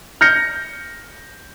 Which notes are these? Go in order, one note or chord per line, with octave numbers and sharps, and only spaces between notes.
F6 G6 A#6 C#7